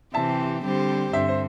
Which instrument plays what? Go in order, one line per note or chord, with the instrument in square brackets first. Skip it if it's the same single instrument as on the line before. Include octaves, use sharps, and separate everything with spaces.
[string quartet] C3 E3 C4 G4 [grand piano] E5 A5
[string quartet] D3 G3 C4 G4 C5
[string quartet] G2 D3 C4 [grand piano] C5 E5
[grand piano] C5